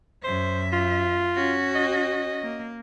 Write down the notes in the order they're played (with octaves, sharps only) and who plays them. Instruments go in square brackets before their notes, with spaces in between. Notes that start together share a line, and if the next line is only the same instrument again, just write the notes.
[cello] F#2 E5 [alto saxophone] C5
[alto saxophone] F4
[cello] C#4 F#4
[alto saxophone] D#5
[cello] A#3